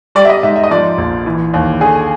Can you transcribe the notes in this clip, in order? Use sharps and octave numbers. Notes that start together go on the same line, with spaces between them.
G3 D5
E5
D#5
G#2 E5
E5
D#5
F3 D5
A#1
E3
D#2
D3 G#4